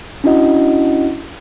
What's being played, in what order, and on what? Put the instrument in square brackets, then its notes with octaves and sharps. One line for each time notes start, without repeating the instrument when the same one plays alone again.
[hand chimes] C#4 D4 E4 F#4 D#5 F#5